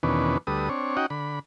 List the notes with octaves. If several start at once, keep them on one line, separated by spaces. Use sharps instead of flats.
E2 B2 D#3 C#4 D4 B4
D2 G3 A4 B4 D#6
C4 D4 C#5
C#4 D#4 F#4 D#5 F#5 G5
D3 B5